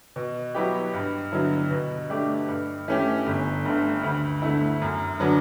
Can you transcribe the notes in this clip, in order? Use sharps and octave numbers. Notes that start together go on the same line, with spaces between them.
B2
F#3 B3 E4 G4
G2
D3 F#3 B3 E4
B2
A3 D4 G4
G2
E3 A3 C#4 G4
G1
G2 D3 A3
D2
D3 A3 E4
F#2
D3 F#3 B3 D4